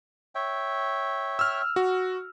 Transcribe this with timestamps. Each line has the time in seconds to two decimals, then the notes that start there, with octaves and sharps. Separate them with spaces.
0.35 C#5 E5 G5
1.39 E6 F6
1.76 F#4